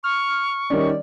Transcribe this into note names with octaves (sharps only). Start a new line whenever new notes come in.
C#6 F6
D#3 G3 C#4 D5